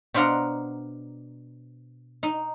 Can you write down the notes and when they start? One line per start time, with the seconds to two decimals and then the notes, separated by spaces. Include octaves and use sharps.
0.14 B2 D4 C5 F5 F#5 A#5
2.23 D#4